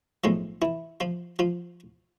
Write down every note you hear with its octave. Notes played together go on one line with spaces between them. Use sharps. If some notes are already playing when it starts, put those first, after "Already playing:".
B1 A2 F3 G#3 F4
E3 E4
F3 F4
F3 F4